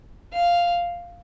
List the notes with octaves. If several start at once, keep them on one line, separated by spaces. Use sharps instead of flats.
F5